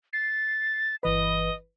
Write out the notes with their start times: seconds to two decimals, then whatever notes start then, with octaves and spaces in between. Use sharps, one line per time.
0.13 A6 C7
1.03 G1 E3 B4 D#5